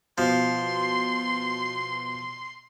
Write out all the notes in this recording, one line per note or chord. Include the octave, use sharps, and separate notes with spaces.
B2 F3 C6